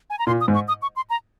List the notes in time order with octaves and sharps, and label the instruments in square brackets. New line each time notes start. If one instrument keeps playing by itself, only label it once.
[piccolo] G#5
A#5
[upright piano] A#2 [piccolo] C6
[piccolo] D#6
[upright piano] G#2
[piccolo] C#6
D#6
C#6
C6
A#5